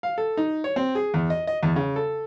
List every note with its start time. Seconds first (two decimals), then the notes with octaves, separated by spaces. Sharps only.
0.03 F5
0.18 A4
0.37 D#4
0.64 C#5
0.76 C4
0.95 G#4
1.14 E2
1.30 D#5
1.47 D#5
1.63 E2
1.76 C#3
1.96 A4